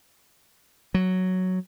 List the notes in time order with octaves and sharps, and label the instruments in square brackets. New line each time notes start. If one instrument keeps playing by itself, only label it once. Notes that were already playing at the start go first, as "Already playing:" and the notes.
[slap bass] F#3